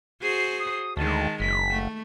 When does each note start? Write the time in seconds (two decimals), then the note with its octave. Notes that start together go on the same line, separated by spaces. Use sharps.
0.22 F#4 G#4 C5
0.60 D#6
0.97 D2 D#3 G#3 A5
1.40 F#1 B6
1.70 A3